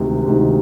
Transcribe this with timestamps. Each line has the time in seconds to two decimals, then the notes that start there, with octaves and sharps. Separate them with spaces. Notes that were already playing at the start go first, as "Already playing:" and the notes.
Already playing: D2 C3 D#3 G#3
0.26 D2 C3 D#3 G#3